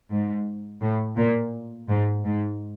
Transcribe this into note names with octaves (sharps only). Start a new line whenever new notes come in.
G#2
A2
A#2
G#2
G#2